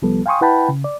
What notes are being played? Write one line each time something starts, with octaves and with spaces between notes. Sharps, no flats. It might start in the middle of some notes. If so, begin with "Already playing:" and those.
C2 F3 G3 B3 A4
F5 G5 G#5 C6 C#6 D#6
E4 B4 F#5 G5 A5 B5
C#3
D5